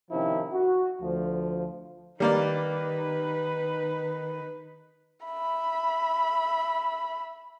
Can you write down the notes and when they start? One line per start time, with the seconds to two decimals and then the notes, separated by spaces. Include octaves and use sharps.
0.11 C3 D#3 F3 C#4 E4
0.53 F#4
1.01 D2 F3
2.20 D#3 G3 A#3 D#4 B4 D5
5.25 E5 B5